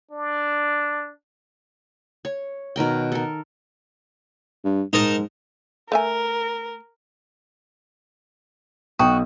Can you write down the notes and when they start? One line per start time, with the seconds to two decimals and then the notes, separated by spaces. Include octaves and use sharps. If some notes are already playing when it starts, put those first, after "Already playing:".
0.11 D4
2.25 C#5
2.76 B2 D#3 A#4 G5
3.12 A4 A#4
4.65 G2
4.93 G#2 D#4 A#4 A5
5.92 A3 A#4 E5 G#5
8.99 B1 F#4 G5 D#6